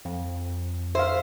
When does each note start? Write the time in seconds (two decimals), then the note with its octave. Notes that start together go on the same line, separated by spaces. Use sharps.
0.05 F2
0.95 C5 E5 F5